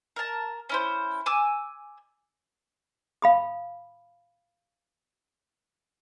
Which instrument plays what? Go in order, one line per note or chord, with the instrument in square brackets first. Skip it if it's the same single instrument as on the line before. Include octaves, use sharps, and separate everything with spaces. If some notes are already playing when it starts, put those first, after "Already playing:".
[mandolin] A#4 A5
C#4 E4 C5
G#5 D6 E6
[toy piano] F5 B5 D#6